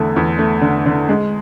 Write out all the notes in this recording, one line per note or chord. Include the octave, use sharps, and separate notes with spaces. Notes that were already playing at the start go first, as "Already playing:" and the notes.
Already playing: E2 D3 A3
E2
A3
D3
D3
G#3